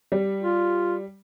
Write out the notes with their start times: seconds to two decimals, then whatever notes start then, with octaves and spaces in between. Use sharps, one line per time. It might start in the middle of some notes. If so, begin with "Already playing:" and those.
0.12 G3
0.43 F4